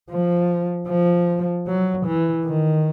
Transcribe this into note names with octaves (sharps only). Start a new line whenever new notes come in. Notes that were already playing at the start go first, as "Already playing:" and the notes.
F3
F3
F#3
E3
D#3